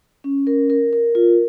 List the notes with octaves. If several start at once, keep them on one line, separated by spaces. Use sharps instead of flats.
C#4
A#4
A#4
A#4
F4